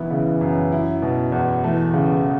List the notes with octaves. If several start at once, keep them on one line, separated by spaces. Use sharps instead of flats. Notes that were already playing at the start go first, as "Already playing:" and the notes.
Already playing: B1 E3 B3
C#3
F#2
E4
B2
E2
E3 A3
C#3